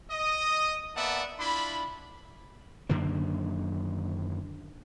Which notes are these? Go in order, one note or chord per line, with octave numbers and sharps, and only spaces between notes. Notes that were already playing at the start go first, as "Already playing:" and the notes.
D#5 D#6
A#3 B3 D5 E5 F#5 A5
D4 E4 F4 B5
F#2 D3 D#3 A#3